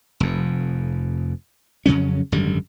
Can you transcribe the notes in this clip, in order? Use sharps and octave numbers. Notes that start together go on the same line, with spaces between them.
F1 F2
F2 C#3 F#3 C#4
G#1 F#2 D3 G3